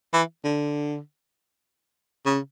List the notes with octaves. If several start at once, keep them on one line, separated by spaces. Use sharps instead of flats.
E3
D3
C#3